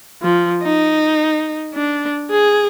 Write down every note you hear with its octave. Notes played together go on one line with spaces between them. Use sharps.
F3
D#4
D4
G#4